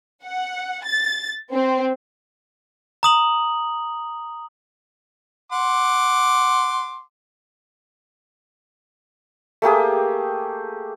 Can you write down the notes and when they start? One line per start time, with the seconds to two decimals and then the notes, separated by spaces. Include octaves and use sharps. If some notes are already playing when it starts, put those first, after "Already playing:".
0.24 F#5
0.84 A6
1.51 C4
3.03 A#5 D#6 F#7
5.52 F#5 C6 D6
9.62 A3 A#3 G4 G#4